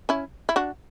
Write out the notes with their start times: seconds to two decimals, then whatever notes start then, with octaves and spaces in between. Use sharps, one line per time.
0.09 C#4 E4
0.49 E4
0.56 D4 F#4